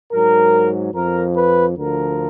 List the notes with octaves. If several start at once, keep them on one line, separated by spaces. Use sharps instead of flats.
G#2 F#3 A#4
F2 F3 A#4
B4
D2 D3 F3 A#4